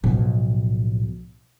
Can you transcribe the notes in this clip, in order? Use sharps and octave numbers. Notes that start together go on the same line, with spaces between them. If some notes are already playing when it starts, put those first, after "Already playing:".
B1 A2 F3 B3